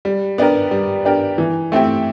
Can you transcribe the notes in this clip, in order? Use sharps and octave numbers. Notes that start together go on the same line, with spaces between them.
G3
B3 D4 G4 A#4
G3
B3 D4 G4 A#4
E3
A3 C4 E4 G4